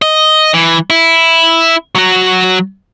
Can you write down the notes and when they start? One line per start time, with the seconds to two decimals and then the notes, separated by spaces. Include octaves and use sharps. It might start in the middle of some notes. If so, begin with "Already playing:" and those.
0.02 D#5
0.54 E3
0.90 E4
1.95 F#3 F#4